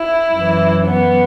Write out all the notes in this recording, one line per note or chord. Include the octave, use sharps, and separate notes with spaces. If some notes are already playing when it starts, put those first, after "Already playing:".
Already playing: E4
F#2 E3
B3